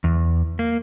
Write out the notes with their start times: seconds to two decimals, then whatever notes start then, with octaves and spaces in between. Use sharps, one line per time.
0.04 E2
0.59 A#3